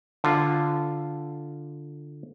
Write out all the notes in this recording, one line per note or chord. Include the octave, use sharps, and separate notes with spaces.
D3 F4